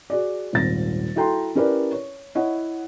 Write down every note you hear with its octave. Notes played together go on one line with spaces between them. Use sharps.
F#4 G#4 D5
D#1 G#1 A6 A#6
E4 F#4 A4 G5 A#5 C6
C#4 E4 G4 A#4 B4 D5
C#5
E4 C#5 D#5 E5 F#5